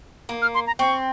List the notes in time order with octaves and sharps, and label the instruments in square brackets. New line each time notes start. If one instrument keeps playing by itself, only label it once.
[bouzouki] A#3
[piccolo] F6
C6
A#5
[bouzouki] C4 [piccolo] C#6